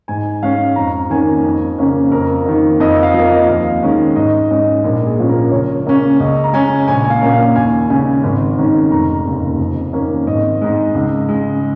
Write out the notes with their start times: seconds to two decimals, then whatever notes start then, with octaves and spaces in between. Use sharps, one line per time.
0.08 G#2 G#5
0.43 G#3 C#4 F5
0.76 F2 A#5
1.10 D#3 A#3 C#4 G#5
1.44 F2
1.78 C#3 A#3 C#4
2.12 F2 A#4
2.46 D#3 A#3
2.80 F2 D#5
3.03 F5
3.14 F3 A#3
3.25 D#5
3.48 D#2 F5
3.83 D#3 G#3 C#4
4.16 G#2 D#5
4.50 G#3 C#4 D#5
4.84 A#1 A#4
5.07 G#4
5.18 A#2 F3 C#4
5.29 A#4
5.51 C#2 C#5
5.86 C#3 A#3 C#4
6.20 C#2 D#5
6.44 A#5
6.53 C#3 G#3 C#4 G#5
6.88 A#1 G#5
7.04 G#5
7.10 F5
7.21 A#2 A#3 C#4
7.34 F5
7.56 D#2 G#5
7.90 C#3 G#3 C#4 G#5
8.23 G#1
8.58 G#2 D#3 C#4
8.92 F1 A#5
9.25 D#2 C#3
9.59 F2
9.93 D#3 A#3 C#4
10.27 G#1 D#5
10.61 G#2 G#3
10.95 C#2
11.29 C#3 G#3